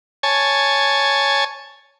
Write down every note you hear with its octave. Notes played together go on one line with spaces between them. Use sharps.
C#5 G#5 A5